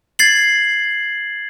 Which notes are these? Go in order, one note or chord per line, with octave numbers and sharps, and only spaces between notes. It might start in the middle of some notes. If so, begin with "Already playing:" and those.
G#6 A6 C7 F#7